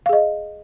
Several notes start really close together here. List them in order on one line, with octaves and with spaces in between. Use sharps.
F5 G#4 D#5